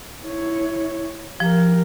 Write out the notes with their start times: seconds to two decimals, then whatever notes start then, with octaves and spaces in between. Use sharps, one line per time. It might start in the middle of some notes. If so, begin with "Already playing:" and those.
0.25 E4 C#5
1.40 F3 G4 A#4